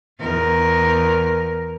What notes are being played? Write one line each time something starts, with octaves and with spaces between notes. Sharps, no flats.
E2 A#4